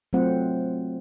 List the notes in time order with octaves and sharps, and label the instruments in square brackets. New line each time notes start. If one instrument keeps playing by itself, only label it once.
[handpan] F#3 A3 C4 F4 C5 F#5